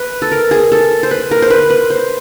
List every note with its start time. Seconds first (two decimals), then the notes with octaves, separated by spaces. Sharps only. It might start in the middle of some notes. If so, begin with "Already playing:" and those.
Already playing: B4
0.22 A4
0.32 A#4
0.51 G#4
0.72 A4
1.03 C5
1.11 B4
1.31 A#4
1.42 C5
1.50 B4
1.70 B4
1.90 C5